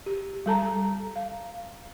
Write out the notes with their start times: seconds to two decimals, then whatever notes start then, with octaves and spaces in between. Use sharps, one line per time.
0.06 G4
0.46 G3 A4 A5 A#5
1.16 F5